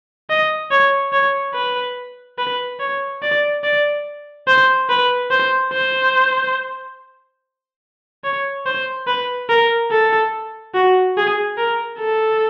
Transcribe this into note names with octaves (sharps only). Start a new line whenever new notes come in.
D#5
C#5
C#5
B4
B4
C#5
D5
D5
C5
B4
C5
C5
C#5
C5
B4
A#4
A4
F#4
G#4
A#4
A4